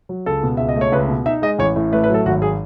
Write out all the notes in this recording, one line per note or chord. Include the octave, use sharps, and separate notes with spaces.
F#3
C#2 A4
B2
C#2 E5
D#5
A3
C#5
C#2 B4
B2
D#4 E5
G#3 D#5
A1 C#5
A2
A3 B4
B4
F#3 A4
G#1 F#4
G#4